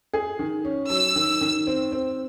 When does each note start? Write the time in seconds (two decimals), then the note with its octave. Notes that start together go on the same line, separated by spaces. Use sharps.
0.14 G#4
0.39 D#3
0.65 C#4
0.90 F#3 E6
1.16 D#3
1.41 D#3
1.67 C4
1.92 C4